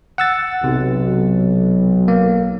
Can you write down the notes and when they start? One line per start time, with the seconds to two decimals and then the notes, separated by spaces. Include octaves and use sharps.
0.18 F#5 E6 A6
0.64 B1 C3
2.08 A#3